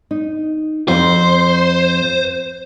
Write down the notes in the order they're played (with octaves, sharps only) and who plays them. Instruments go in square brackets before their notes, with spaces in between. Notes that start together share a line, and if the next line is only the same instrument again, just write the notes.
[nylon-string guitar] D#4
[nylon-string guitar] F2 [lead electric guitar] C5